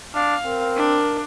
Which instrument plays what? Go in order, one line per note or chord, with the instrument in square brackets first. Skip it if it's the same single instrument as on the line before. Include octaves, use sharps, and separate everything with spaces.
[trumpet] D4 [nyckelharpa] F5
[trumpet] C4 [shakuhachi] A#4
[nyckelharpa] D4